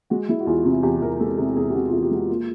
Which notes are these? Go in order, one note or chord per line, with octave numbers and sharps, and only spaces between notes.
G#3 F#4
G#3 E4
F#4
E2 F4
C3 E4
E2 G4
E2 A#4
G#3 A4
C3 G#4
E2 G#4
G4
C3 F#4
F4
E2
G4
G#3 F#4
A#3 F4